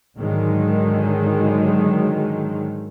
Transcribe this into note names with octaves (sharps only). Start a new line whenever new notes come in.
G#2 D3 D#3 F#3 G#3